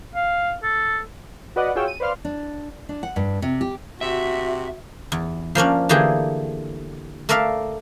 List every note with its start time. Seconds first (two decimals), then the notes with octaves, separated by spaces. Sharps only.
0.15 F5
0.63 A4
1.56 F#4 B4 D5 D#5 F#5
1.75 F4 F#4 G#4 C#5 G5 E6
1.88 D#7
2.00 B4 C5 D5 F5 C6 F6
2.25 D4
2.89 D4
3.03 F#5
3.16 G2
3.42 C3
3.61 G4
4.01 C3 F#4 E5
5.12 E2
5.55 F3 A#3 C#4 D4
5.89 D3 E3 A3 A#3 G4 G#4
7.29 A3 A#4 D5 E5 F5